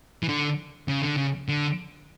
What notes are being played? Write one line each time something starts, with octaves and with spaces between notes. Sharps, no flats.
E3
D3
C#3
D3
C#3
D3